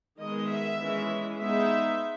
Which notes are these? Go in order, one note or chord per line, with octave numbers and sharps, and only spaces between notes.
D#3 G#3 B3 D#5
E5
E3 G#3 C#4
G#3 B3 D#4 E5